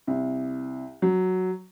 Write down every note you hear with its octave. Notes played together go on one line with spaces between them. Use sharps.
C2
F#3